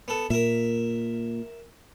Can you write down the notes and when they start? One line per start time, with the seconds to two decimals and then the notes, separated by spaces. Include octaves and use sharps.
0.08 B3 A4
0.30 A#2 A#4 E5